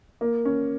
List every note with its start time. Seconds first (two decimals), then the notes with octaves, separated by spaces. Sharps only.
0.21 A#3
0.45 C#4